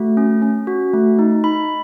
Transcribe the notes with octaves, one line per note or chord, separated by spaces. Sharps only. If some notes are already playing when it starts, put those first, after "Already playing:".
Already playing: A3 F#4
C#4
C#4
F#4
A3
D#4
D#4 B5